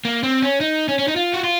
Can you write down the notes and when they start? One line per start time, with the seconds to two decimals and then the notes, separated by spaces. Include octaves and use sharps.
0.05 A#3
0.23 C4
0.42 C#4
0.61 D#4
0.89 C#4
0.99 C#4
1.08 D#4
1.16 F4
1.34 F#4
1.44 F4